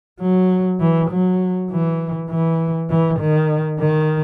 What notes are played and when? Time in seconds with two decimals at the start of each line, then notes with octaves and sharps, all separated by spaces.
0.21 F#3
0.80 E3
1.10 F#3
1.70 E3
2.30 E3
2.90 E3
3.20 D#3
3.79 D#3